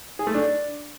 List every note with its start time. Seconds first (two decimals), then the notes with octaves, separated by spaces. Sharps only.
0.19 G#4
0.27 A3
0.35 D4